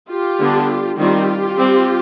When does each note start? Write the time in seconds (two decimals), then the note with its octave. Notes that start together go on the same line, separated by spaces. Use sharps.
0.11 F4 G4
0.39 D3 G3 B3 D4
0.98 D#3 G3 C4 F4 G4
1.57 G3 C4